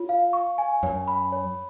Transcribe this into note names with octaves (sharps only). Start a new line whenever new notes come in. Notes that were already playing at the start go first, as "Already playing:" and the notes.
Already playing: F4 C#5
F5
C#6
G#5
F#2 C#5
B5
C#5